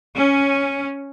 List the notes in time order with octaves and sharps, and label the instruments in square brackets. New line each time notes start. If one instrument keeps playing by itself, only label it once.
[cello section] C#4